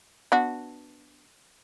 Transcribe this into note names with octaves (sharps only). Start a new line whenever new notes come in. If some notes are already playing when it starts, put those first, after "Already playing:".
B3 D4 F#4